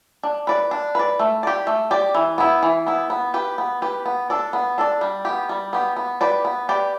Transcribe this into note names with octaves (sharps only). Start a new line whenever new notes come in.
D4
B4 D5
D4
B4 D5
A3
G4 D5
A3
G4 D5
E3
B3 E4
E3
B3 E4
B3
G4 B4
B3
G4 B4
B3
D4 A4 D5
B3
D4 A4 D5
G3
B3 G4
G3
B3 G4
B3
G4 B4 D5
B3
G4 B4 D5